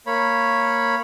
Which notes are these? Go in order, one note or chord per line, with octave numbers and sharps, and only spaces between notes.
A#3 C#5 B5